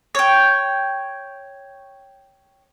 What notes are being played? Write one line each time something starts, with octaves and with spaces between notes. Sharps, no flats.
C#5 G5